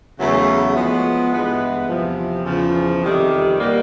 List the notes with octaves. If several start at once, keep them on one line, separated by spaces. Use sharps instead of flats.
E2 C#3 F#3 A3
F3 G#3 B3
G2 E3 G#3 B3
E2 C3 F3
E2 C#3 F3
F2 C3 D#3 G3
B2 G3 A#3